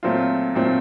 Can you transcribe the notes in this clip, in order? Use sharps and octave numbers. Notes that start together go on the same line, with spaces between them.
A#2 F#3 A3 C4 F4
A#2 F#3 A3 C4 F4